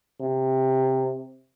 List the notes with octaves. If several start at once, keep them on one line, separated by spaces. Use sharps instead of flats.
C3